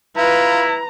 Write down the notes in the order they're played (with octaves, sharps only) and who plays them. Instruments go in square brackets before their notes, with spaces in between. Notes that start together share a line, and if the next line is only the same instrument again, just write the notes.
[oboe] E4 [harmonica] F4 [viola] B4 [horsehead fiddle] A#5